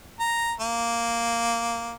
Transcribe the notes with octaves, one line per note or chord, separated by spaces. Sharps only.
A#5
A#3